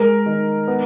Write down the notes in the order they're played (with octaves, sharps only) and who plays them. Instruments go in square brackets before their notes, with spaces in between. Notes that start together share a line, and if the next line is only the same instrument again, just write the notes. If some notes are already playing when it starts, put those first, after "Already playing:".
Already playing: [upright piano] G#3 [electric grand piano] A#4
[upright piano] D#3
B3